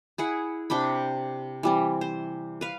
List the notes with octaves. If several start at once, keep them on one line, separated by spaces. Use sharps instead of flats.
E4 G#4 F#5
C3 D4 G5 B5
E3 G3 C4
C5
B4 F5